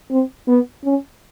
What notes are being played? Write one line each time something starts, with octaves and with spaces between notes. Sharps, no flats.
C4
B3
C#4